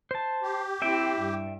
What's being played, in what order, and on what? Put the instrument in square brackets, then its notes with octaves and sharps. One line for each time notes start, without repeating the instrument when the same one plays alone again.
[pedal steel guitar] C5 A5
[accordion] G4
[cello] C4 E4 [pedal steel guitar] E5 G5
[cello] G2